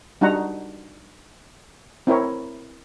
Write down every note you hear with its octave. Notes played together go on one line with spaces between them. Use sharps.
G3 D4 D#4 F#4 F#5 A#5
C4 E4 A#4 C#5